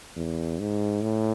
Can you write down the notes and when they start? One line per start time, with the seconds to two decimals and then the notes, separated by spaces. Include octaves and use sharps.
0.17 E2
0.59 G#2
1.03 A2